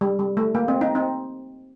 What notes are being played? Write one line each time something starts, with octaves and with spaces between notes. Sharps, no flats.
G3
G3
A3
A#3
C4
C4 D#4
C4 D#4